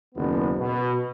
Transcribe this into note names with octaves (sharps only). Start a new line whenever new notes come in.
F#1 D#2 B3
B2